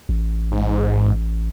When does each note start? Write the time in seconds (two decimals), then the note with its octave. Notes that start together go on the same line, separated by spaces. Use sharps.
0.09 A1
0.52 G#2